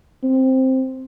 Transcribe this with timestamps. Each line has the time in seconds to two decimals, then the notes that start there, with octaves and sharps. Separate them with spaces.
0.23 C4